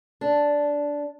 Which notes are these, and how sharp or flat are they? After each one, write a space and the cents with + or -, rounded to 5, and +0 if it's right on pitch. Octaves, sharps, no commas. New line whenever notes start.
D4 -10